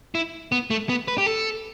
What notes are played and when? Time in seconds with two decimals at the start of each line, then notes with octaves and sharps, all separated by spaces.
0.15 E4
0.52 B3
0.70 A3
0.89 B3
1.08 B4
1.18 G4
1.26 A4